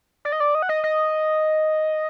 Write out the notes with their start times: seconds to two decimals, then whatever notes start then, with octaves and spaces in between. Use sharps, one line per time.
0.25 D5
0.32 D#5
0.40 D5
0.55 D#5
0.62 F#5
0.69 D#5
0.84 D#5